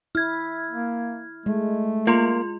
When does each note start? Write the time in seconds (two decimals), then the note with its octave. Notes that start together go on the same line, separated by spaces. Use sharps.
0.15 E4 F6 G#6
0.70 A#3
1.46 G#3 A3
2.07 A#3 F4 C6